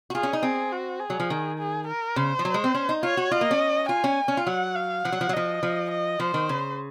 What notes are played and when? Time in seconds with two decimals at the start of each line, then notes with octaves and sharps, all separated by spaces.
0.10 F#4
0.14 F4 G#4
0.23 C#4
0.33 D#4
0.43 C4 G#4
0.72 F#4
1.01 G#4
1.10 F#3
1.20 F3
1.30 D#3
1.59 G#4
1.87 A#4
2.16 C#3 C5
2.39 F3
2.45 F#3
2.54 G#3
2.64 C4
2.75 C#4
2.89 D#4
3.03 F4 C#5
3.17 F#4
3.31 F4 D#5
3.41 A#3
3.51 C#4
3.89 F4 G#5
4.04 C#4
4.28 C#4
4.37 F4
4.47 F#3 F#5
4.76 F5
5.05 F3 F#5
5.12 F#3
5.21 F3
5.29 F#3
5.33 F3 D#5
5.63 F3
5.91 D#5
6.20 F3 C5
6.34 D#3
6.49 C#3